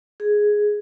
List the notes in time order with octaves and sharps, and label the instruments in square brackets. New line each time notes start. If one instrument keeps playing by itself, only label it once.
[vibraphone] G#4